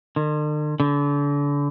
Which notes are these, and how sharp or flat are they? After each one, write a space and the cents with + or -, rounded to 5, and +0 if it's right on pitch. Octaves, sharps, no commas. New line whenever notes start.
D3 +45
D3 -35